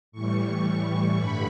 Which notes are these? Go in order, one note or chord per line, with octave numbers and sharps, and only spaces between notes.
A2 E3 G3 C#6
G2 D3 B5